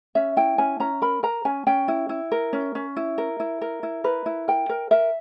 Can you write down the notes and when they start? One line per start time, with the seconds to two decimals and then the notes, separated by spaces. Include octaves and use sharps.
0.15 C#4 E5
0.37 E4 G5
0.58 C#4 G#5
0.80 C#4 A#5
1.02 A#4 B5
1.23 A#4 A#5
1.45 C#4 G#5
1.67 C#4 G5
1.88 E4
2.09 E4
2.32 A#4
2.53 C#4
2.75 C#4
2.96 E4
3.18 A#4
3.40 E4
3.61 A#4
3.83 E4
4.04 A#4 B4
4.26 E4
4.48 A#4 G5
4.69 A#4
4.91 A#4 E5